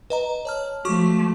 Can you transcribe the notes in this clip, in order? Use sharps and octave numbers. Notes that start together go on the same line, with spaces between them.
B4 D#5 A#5
C#5 A5 F6
F3 A3 F#4 C#6 D6